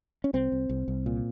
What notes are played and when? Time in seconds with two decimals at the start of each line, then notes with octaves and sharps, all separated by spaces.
0.24 C#4
0.33 C2 C4
0.52 C2
0.69 C2
0.88 C2
1.06 A#2